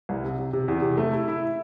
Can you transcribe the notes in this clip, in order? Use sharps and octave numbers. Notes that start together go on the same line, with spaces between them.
C2
C3
C3
C3
E2
C3
A3
E4
E4